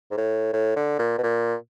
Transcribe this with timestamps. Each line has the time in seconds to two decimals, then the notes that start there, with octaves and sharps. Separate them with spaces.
0.11 G#2
0.17 A2
0.53 A2
0.76 D3
0.99 A#2
1.18 B2
1.23 A#2